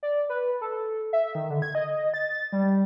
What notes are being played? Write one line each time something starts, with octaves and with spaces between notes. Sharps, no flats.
D5
B4
A4
E5
D#3
D3
G#6
D#5
A6
G3